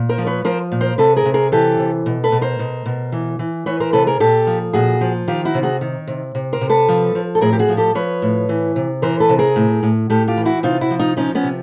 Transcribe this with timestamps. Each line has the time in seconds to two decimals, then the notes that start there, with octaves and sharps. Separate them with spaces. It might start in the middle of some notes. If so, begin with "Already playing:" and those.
Already playing: A#2
0.09 A#4 C5
0.18 F3
0.27 B4 C#5
0.45 F3 A#4 C5
0.72 A#2
0.81 A#4 C5
0.98 C3 A4 B4
1.16 G#4 A#4
1.25 C3
1.34 G#4 A#4
1.52 E3 G4 A4
1.79 C3
2.06 B2
2.24 A4 B4
2.32 B2
2.41 A#4 C5
2.59 B2
2.86 B2
3.12 E3
3.39 E3
3.66 E3 B4 C#5
3.80 A#4 C5
3.93 C3 A4 B4
4.07 G#4 A#4
4.20 A#2 G4 A4
4.47 F3
4.73 A#2 F#4 G#4
5.01 F3
5.28 D#3 F4 G4
5.45 E4 F#4
5.54 C3
5.63 F#4 G#4
5.81 D#3
6.07 C3
6.35 C3
6.53 A#4 C5
6.61 C3
6.70 A4 B4
6.89 F3
7.15 F3
7.35 A4
7.41 A2 G#4 A#4
7.53 G4
7.59 F#4 G#4
7.69 F3
7.77 G4 A4
7.95 F3 B4 C#5
8.22 A2
8.49 E3
8.76 C3
9.02 E3 A#4 C5
9.20 A4 B4
9.29 C3
9.39 G#4 A#4
9.56 A2
9.83 A2
10.10 A2 G4 A4
10.28 F4 G4
10.37 E3
10.45 E4 F#4
10.63 C3 D#4 F4
10.81 E4 F#4
10.91 F3
10.99 D#4 F4
11.17 F3 C#4 D#4
11.35 B3 C#4
11.44 C3